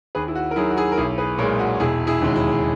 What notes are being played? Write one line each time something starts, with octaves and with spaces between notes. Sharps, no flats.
D#2 G#4 B4
E4
F#4
A#4
D#3 F#3 E4 G#4
F#4
E4 G#4
A#4
B1 E4 G#4
G#4 B4
A#2 G#3 A#4 C#5
F#4
E1 E4 G#4
E4 G#4
D#2 C#3 G#3
E4